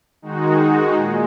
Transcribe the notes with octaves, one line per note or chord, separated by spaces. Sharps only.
D#3 G#3 D#4 F#4
A#2 G#3